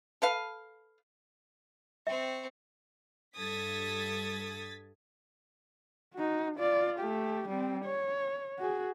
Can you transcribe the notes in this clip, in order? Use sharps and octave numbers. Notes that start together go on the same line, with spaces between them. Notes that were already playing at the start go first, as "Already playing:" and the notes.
A4 B4 F5
C4 E5 G5 C#6
G2 A4 D#6 G#6 A6 B6
D#4 F#4
F4 D5
A3 G4
G3 C4
C#5
F#4 G#4